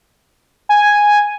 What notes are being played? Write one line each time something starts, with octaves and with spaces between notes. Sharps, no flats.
G#5